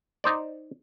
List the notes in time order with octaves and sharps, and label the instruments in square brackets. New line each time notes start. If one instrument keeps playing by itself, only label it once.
[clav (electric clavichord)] D#4 C5 D5